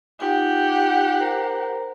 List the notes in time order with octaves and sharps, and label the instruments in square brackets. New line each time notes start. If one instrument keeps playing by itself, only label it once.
[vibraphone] D#4 F4 G#5 [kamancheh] G4 F#5
[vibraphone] A#4 C5 A#5